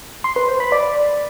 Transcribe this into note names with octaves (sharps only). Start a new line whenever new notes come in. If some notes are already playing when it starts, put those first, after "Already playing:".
C6
B4
C5
B5
D5